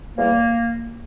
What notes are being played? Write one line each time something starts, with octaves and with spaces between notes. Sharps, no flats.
E2 E3 G3 A#3